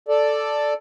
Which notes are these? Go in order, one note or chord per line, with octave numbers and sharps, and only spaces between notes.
A4 D5